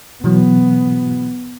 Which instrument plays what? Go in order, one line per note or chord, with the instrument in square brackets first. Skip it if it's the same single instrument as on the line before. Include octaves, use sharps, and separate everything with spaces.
[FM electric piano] B2 E3 F#3 [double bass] B3